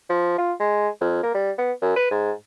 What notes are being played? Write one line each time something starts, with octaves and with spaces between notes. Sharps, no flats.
F3
F4
G#3
F2
A#3
G3
B3
F#2
B4
G#2